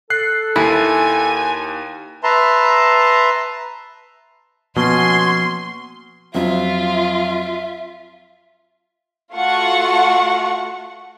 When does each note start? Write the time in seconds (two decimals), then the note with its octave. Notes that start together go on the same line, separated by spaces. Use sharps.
0.10 A4 F#6 C7
0.56 D#2 E4 G#5
2.23 B4 E5 A5 A#5 C6
4.76 B2 F3 A#3 C#4 F#4 G#5 C6
6.35 F2 F#3 C4 F4 E5
9.34 A3 F4 F#4 F#5 C#6